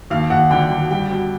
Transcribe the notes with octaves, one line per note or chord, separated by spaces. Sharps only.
D#2 F5
D#2 F#5
D3 G5
D3
G3 G5
B2